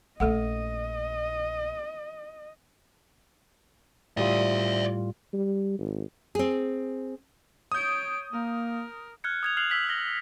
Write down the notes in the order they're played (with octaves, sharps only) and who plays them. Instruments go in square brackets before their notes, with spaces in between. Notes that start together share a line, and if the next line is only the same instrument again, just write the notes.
[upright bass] A#1 C#4 [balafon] A3 A4 F#5 [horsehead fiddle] D#5
[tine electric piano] A2 G3 F4 [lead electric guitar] D5 E5
[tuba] G3
G#1
[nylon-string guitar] C4 G#4
[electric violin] C#5 D7 [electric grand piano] D#6 G6
[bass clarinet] A#3 [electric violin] A#4
[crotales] F6 F#6 G#6 C#7
D#6 G#6 F7
F6 F#6 C7 F7 F#7
E6 F6 G#6 B6 F7 F#7
F6 F#6 A#6 G7